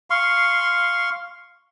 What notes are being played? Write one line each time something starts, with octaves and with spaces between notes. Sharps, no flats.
F5 C6 C#6